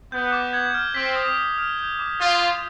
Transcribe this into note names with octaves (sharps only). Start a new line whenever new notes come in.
B3 G6
D6
G#6
F6
C4 B6
D#6
B6
F6
G6
D6
F4 G6
D#6